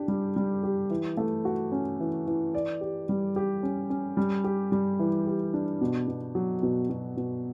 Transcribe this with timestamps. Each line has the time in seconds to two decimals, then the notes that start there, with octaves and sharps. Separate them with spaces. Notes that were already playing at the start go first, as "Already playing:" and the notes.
Already playing: D4 G4
0.08 G3
0.36 G3
0.63 G4
0.90 E3
1.17 A3
1.45 F#4
1.72 C#4
2.00 E3
2.27 E3
2.55 D5
2.81 G4
3.09 G3
3.36 G4
3.63 C#4
3.90 C#4
4.17 G3
4.44 G4
4.72 G3
4.99 E3
5.27 G4
5.54 D4
5.81 B2
6.08 B2
6.35 F#3
6.63 B2
6.89 B2
7.17 B2